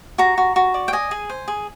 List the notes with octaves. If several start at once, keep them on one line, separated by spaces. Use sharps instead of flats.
F#4 A#5
F#4
F#4
D5
G5
D#5 G#5
G#4
C5
G#4